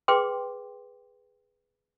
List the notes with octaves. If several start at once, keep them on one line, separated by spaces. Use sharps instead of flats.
G#4 B4 G5 C6 D6